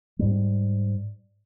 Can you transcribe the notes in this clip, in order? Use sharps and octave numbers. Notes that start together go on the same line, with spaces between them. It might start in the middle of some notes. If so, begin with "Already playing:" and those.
G#2 G3